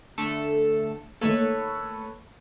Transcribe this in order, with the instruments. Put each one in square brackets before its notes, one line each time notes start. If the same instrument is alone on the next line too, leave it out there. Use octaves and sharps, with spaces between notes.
[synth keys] D3 A3 A4
[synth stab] D#3 A3 A#3 [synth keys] A4 B4 C#5